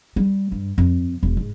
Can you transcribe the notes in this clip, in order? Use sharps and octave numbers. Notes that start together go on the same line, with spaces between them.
G3
G2
F2
E1
G#2